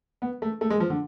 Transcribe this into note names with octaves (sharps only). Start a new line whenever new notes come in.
B3
A3
A3
G#3
F3
D3